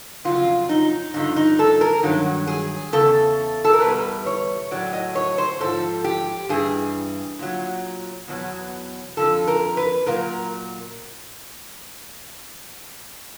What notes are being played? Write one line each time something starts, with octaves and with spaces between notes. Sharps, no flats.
F2 C#3 F#3 F4
D#4
G2 D3 F3 D#4
D#4
A4
A#4
G2 D#3 F#3
G#4
E2 C#3 A4
A4
A#4
E2 B2 G3 B4
C#5
A2 F#3 D5
D#5
C#5
C5
G#2 F3 A4
G4
G2 E3 G3 G#4
A#2 F#3
E2 B2 F#3
F2 D3 F3 A4
A#4
B4
A#2 F#3 A#4